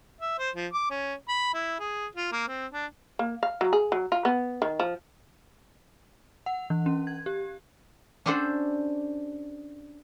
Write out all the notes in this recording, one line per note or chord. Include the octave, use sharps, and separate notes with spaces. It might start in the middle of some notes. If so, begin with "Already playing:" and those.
E5
C5
F3
D6
C#4
B5
E4
G#4
F4
A#3
C4
D4
A#3
F5
F#3
G#4
F#3
F4
B3
D#3
F3
F#5
E3
C#4
G#6
G4
C#4 D4 G4 A4 C5 F#5